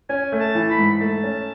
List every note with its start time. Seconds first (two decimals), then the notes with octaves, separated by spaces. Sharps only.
0.09 C#4 G#5
0.32 A3
0.40 A5
0.55 E3
0.70 B5
0.78 G#2
1.01 A3 A5
1.23 C#4